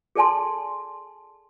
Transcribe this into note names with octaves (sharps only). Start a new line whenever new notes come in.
G#4 A4 D5 G#5 A5 C6